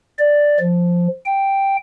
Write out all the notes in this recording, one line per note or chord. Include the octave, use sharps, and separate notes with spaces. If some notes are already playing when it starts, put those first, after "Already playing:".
D5
F3
G5